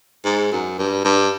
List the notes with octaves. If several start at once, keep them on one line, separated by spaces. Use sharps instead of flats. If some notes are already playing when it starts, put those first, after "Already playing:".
G#2
F#2
G2
G2